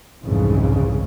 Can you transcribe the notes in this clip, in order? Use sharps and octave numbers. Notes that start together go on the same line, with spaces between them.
C2 F2 G#2 C#3 E3